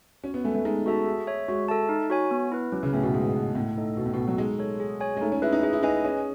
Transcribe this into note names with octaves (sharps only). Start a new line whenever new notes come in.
C#4 F#4
B3
A3 B4 E5 G#5
A3
G#3 D#4
F#4 A4 E5 A5
G#4
C#5 E5
G#3 F#4
A4 E5 A5
D#4
F#4 C#5 G#5
B3
E4 B4
F#3 C#4
C#3
A2 G#4 B4 E5 G#5
B2
G#2 G#4
D#5 F#5 A5
A2 A3
D#4 A4 D#5
B2 B3
A2
B2
F#4 A4
F#3
G#3 D#4
A4 C#5
G#4
C#5 G#5
G#3
A3 D#4
C#4
E4 G#4 B4
D#4
D#4 G#4
E4
D#4 B4 D#5 G#5
C#4 G#4